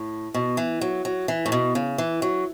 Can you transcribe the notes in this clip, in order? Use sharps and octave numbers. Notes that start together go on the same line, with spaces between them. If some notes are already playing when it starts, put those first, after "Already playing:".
Already playing: A2
B2
E3
F#3
F#3
E3
A2
B2
C#3
E3
F#3